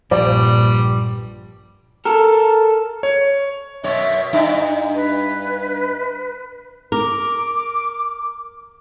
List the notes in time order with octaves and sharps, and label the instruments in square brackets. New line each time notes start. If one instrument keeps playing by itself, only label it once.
[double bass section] A#1 [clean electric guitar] G2 F3 [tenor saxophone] G3 [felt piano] D5
[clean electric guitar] A4 A#4
[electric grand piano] C#5
[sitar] F#2 B2 C#5 [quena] E5
[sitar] G2 D#4 E4
[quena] B4
[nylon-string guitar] A#4 [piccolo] D6